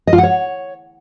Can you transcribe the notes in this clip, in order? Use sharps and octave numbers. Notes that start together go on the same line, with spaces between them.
D#5
F4
F#5
C#5